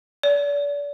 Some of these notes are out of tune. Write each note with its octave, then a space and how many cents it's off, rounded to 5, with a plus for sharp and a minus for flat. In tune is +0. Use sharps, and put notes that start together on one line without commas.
D5 -35